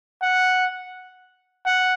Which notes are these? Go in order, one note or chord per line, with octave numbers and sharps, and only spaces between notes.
F#5
F#5